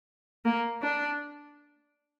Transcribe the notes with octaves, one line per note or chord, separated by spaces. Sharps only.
A#3
D4